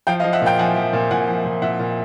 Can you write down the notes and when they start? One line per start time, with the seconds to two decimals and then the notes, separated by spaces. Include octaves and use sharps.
0.07 F3 F5 G5
0.20 D#5 F5
0.24 F3
0.33 E5 F#5
0.42 A#2 F5 G5
0.59 F3 F#5 G#5
0.76 F3
0.93 A#2
1.11 A#2 F#5 G#5
1.28 F3
1.45 A#2
1.62 A#2 E5 F#5
1.79 A#2